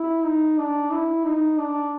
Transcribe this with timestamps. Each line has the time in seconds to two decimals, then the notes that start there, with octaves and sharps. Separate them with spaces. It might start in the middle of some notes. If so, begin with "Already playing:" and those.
Already playing: E4
0.24 D#4
0.58 D4
0.92 E4
1.25 D#4
1.58 D4